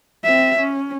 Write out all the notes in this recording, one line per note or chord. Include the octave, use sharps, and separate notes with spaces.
C4 E5
C#4